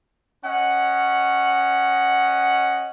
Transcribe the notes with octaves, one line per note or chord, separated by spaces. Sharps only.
C#4 D#5 F#5